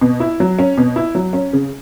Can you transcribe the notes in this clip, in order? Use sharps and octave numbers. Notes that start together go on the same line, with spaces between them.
B2
E4
F#3
C#4
B2
E4
F#3
C#4
C#3